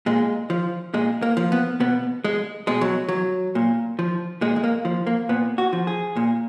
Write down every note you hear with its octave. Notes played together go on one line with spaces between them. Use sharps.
A#2 G#3
F3
A#2 G#3
A#3
F3
B3
B2 B3
G#3
B2 G#3
F#3
F#3
A#2
F3
A#2 G#3
G#3
A#3
F3
A#3
A#2 B3
F#4
F3
G#4
A#2